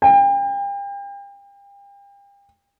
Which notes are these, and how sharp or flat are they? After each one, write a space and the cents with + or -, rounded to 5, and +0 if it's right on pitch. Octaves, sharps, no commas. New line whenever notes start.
G5 +35